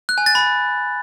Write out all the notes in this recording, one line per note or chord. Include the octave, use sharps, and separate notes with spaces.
F#6
G#5
A6
B5